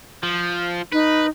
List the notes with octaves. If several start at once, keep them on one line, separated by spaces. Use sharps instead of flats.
F3
D#4 B4